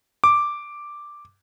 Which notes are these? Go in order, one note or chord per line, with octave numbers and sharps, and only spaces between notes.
D6